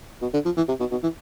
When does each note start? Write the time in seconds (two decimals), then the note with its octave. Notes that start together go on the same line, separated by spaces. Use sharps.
0.22 B2
0.33 D3
0.45 F3
0.57 E3
0.68 C3
0.80 B2
0.91 B2
1.03 E3